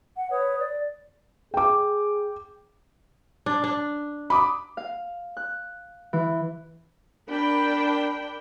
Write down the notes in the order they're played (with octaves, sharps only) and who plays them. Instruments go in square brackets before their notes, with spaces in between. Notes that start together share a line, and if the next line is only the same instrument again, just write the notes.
[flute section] F#5
B4 C#5 D#6
D5
[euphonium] G#4 [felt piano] G5 D6
[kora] D4
D4
[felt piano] B5 D6 D#6
[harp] F5
F#6
E3
[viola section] D4 A#4 G5 B5